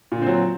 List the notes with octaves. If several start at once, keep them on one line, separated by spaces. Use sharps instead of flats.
A#2 D3 F#3 C4